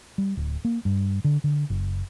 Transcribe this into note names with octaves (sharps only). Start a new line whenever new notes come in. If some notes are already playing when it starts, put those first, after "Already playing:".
G3
D1
A#3
G2
D3
D3
F#1